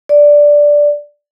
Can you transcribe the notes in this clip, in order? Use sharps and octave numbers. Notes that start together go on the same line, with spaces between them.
D5